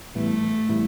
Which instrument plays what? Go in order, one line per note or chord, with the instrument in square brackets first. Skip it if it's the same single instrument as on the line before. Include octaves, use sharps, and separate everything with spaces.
[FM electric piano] A2 E3 G3 B3 E4 [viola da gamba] A3
[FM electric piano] A2 E3 G3 B3 E4